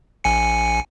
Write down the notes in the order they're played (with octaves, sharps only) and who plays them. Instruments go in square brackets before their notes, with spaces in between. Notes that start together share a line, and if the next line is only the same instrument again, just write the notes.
[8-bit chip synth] A#1 G#5 C#7